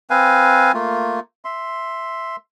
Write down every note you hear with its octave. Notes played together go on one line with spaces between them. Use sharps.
C4 B4 F5 G#5
A3 A#3 F4
E5 C6